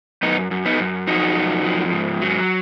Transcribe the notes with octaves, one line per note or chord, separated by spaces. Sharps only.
F#2 B3 D#4
F#2
B3 D#4
F#2
F3 D#4 F#4
F#2
F3
G#2
F#3